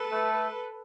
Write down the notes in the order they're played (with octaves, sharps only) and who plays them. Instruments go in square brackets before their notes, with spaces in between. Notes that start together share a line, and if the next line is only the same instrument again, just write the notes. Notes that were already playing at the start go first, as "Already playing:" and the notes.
Already playing: [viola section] A4 B4
[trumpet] A3